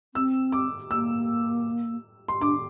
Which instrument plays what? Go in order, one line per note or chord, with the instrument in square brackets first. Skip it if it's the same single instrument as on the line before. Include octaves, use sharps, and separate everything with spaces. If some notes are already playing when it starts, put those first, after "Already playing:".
[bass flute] C4 [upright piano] E6
[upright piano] D6
[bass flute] A#3 [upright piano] E6
[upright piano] C6
[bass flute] D4 [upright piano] D6